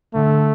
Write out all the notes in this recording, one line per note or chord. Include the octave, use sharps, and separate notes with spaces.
D3 A3